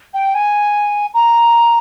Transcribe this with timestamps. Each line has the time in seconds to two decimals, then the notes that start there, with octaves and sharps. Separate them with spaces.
0.14 G5
0.35 G#5
1.14 A#5